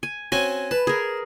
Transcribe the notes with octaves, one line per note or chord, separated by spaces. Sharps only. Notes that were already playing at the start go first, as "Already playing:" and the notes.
G#5
C4 C#4 F#4 G#5
B4 A5
G#4 A#4